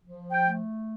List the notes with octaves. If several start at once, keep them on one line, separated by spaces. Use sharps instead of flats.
F3
G5
A3